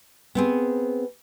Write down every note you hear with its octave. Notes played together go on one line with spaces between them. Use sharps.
B3 C4 G#4